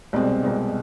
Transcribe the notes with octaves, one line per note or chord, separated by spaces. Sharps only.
C2 B2 G#3 C4 D5
C2 B2 G#3 C4